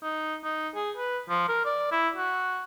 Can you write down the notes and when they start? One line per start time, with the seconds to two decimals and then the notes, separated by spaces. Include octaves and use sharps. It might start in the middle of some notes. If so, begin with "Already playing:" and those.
0.03 D#4
0.44 D#4
0.75 G#4
0.97 B4
1.29 F3
1.48 A#4
1.65 D5
1.91 E4
2.17 F#4